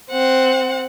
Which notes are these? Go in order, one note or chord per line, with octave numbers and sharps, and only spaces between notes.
C4 F#5